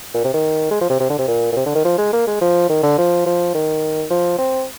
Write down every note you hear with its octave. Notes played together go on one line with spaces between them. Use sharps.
A#2
C3
D#3
G#3
F3
C3
C3
D3
C3
A#2
A#2
C3
D3
D#3
F3
G#3
A#3
G#3
F3
D#3
D3
F3
F3
D#3
F3
C4